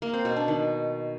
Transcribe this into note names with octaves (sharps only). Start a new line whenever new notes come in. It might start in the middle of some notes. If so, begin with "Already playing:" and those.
A#3
C4
B2
D4
D#3